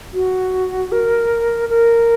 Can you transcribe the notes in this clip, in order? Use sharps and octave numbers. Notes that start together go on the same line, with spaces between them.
F#4
A#4
A#4